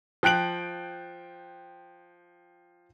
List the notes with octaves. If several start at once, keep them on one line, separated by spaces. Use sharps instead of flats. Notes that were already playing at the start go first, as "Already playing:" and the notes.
F3 G5 F#6 D7 F#7